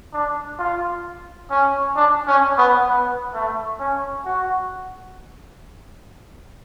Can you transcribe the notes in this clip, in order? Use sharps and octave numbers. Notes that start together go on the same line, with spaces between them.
D4
F4
C#4
D4
C#4
B3
B3
A3
C#4
F#4